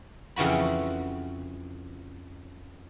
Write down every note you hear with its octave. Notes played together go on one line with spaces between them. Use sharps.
F2 C#3 E3 F#4 B5